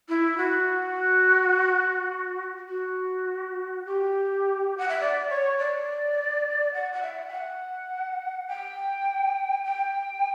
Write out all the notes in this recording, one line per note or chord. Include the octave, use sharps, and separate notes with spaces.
E4
F#4
F#4
G4
F#5
E5
D5
C#5
D5
F#5
F#5
E5
G5
F#5
G5
G5